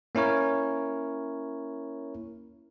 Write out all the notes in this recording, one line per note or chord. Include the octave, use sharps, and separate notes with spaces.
A#3 C#4 E4 A#4 C#5